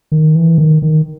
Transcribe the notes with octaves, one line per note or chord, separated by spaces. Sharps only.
D#3
E3
D#3
D#3